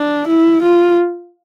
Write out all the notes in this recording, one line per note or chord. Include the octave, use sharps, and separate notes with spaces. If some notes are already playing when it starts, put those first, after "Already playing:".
Already playing: D4
E4
F4